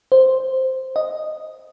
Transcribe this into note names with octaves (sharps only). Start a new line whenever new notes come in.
C5
D#5